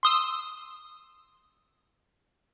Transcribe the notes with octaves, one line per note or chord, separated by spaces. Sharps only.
C6 D#6 E6